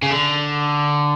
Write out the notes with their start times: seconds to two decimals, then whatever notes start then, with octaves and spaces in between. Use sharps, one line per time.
0.03 C#3
0.11 D3